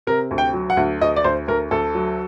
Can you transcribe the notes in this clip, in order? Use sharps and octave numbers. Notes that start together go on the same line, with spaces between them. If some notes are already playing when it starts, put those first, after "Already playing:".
C3 A#4
D2
G5
F#3
F#5
D2
D2 D#5
D5
D2 C5
D2 A#4
D2 A4
F#3